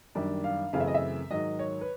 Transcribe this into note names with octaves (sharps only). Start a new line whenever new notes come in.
F#2 D#3 G3 A#3 D4
F5
F#2 C#3 E3 A3 C4 F5
E5
D#5
E5
G#2 D#3 F#3 D#5
C#5
B4